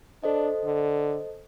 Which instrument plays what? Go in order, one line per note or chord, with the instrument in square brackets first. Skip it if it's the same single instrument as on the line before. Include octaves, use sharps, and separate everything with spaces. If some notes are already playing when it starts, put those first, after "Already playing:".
[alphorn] D4 [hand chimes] A4 C5 D#5
[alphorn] D3